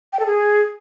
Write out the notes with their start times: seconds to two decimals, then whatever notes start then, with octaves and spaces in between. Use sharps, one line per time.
0.13 G5
0.20 A4
0.26 G#4